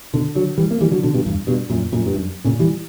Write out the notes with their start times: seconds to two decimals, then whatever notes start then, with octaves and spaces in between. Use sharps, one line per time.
0.13 B2 D3
0.35 D3 F#3
0.58 E3 G3
0.71 A#3
0.81 E3 G3
0.91 D3 F#3
1.03 B2 D3
1.14 G2 B2
1.26 E2 G2
1.47 G2 B2
1.70 F#2 A#2
1.92 F#2 A#2
2.06 G2
2.14 F#2
2.44 A#2 C#3
2.59 E3 G3